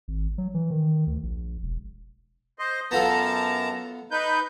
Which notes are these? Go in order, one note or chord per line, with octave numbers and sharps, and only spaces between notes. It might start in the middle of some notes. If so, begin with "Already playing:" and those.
G#1
F#3
E3
D#3
D2
A#1
E1
C5 D#5
F#2 B3 F4 A4 A5 A#5
D#4 B4 G6